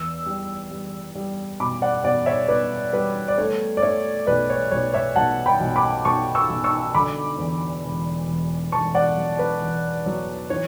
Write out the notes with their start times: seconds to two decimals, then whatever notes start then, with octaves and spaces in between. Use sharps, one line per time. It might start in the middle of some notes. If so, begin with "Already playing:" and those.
Already playing: E2 E6
0.26 G3
0.71 G3
1.15 G3
1.60 B2 B5 D6
1.82 D5 F#5
2.04 B2 D5 F#5
2.26 C#5 E5
2.48 B2 B4 D5
2.93 G3 B4
3.28 D5
3.38 A3 C#5
3.77 D5
3.82 A3 C#5 E5
4.26 B1 B4 D5
4.50 C#5
4.71 B1 C#5
4.94 C#5 E5
5.16 B1 F#5 A5
5.46 G5 B5
5.60 B1
5.76 B5 D6
6.05 B1 A5 C#6
6.35 C#6 E6
6.49 B1
6.64 C#6 E6
6.94 D3 B5 D6
7.38 E2
7.84 E1
8.28 E1
8.72 E1 A5 C#6
8.95 D5 F#5
9.16 F#3
9.39 B4
9.62 E2
10.06 F#3
10.50 E3 C#5